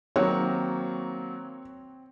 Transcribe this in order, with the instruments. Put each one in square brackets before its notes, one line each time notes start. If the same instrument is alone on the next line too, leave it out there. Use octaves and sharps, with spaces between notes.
[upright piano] D#3 F#3 A#3 [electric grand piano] C4 [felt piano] C#5